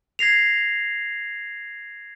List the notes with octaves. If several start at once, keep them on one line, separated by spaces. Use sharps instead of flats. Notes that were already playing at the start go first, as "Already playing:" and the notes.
G#6 A#6 C7 F7